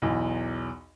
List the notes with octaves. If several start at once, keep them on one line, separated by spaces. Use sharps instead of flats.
B1 E2